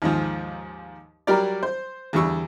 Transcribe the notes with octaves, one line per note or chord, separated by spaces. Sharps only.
D#2 G#2 F3
F#3 G3 G4 A#4 D5
C5
E2 D3 G3 C#6 E6